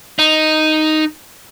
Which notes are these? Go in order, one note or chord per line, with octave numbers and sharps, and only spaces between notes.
D#4